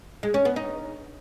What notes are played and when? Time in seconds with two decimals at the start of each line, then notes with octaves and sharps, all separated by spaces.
0.23 G#3
0.34 C#4
0.45 B3
0.56 D#4